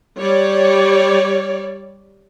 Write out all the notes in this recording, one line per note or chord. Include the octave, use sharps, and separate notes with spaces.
G3 C#5 D5